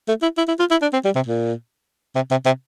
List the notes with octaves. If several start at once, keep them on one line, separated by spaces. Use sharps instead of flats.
A3
E4
E4
E4
F4
E4
D4
C4
G3
C3
A#2
C3
C3
C3